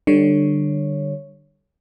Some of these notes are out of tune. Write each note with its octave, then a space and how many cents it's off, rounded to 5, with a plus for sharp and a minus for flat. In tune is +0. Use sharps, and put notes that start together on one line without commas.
D3 +20 G3 +0 C#5 +0